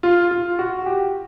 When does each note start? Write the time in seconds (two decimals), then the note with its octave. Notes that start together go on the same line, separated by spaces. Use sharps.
0.03 F4
0.31 F4
0.59 F#4
0.86 G4